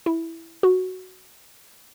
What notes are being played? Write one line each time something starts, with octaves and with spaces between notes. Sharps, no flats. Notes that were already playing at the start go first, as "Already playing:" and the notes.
E4
F#4